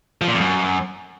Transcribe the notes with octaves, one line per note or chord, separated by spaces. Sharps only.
F3
A#2
F2
F#2